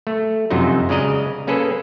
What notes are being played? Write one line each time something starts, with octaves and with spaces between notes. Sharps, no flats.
A3
F#2 C3 F3 F#3 D#4
C#3 G#3 D5 D#5 A#5
A#3 C#4 G#4 A4 B4